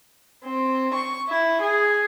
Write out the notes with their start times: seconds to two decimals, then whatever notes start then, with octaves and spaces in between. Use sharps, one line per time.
0.43 C4
0.94 C#6
1.28 E4
1.62 G#4